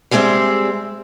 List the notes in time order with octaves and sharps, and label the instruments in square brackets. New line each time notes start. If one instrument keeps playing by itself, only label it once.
[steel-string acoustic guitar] G3 G#3 C4 G#4 E5